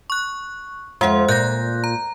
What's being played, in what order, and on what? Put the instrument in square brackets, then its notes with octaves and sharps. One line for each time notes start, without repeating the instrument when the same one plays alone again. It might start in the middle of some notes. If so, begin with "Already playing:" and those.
[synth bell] C#6 F#6
[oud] F2 F4 [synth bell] G#3 F#5
[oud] A#2 [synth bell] F#6 G6 A#6
[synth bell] A#5